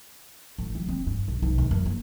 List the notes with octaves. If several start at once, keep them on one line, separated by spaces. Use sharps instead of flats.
A1
F#3
C4
G2
A#1
B1
D#2
F#2
A#3